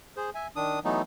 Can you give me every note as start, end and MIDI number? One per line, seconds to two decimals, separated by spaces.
0.17 0.30 68
0.17 0.30 72
0.35 0.47 76
0.35 0.47 80
0.56 0.79 51
0.56 0.79 62
0.56 0.79 87
0.85 1.02 52
0.85 1.02 54
0.85 1.02 57
0.85 1.02 59
0.85 1.02 63